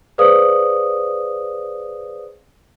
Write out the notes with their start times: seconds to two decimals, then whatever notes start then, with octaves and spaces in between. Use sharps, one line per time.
0.18 G#4 B4 C5 D5 F5 D#6